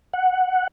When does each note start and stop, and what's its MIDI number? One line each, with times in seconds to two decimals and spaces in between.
0.13 0.67 78